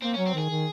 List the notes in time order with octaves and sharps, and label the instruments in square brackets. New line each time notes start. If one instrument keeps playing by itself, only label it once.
[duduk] A#3 [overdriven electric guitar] C4
[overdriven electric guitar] C#4
[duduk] F#3
[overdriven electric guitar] C4
[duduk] D#3 [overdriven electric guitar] G#4
[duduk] D#3